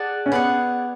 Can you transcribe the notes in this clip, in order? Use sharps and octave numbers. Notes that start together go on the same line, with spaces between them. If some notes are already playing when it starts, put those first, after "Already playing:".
Already playing: G#4 D5 F#5 A5
C#4
B3 G#4 D5 F#5